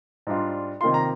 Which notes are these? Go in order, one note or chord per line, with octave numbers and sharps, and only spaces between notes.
G#2 G3 D4 F4
C3 D#3 A#3 F4 C6
A#5